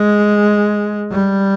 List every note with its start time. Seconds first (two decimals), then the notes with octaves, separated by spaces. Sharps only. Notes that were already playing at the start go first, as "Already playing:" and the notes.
Already playing: G#3
1.12 G3